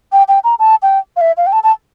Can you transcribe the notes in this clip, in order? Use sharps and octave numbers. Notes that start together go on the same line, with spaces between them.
G5
G5
A#5
A5
G5
F5
E5
F5
G5
A5
A5